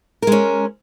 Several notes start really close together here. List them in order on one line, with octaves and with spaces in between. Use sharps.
A#4 G#3 C#4